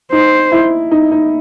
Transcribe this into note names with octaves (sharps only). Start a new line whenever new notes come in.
D#4 C5
E4
D#4
D#4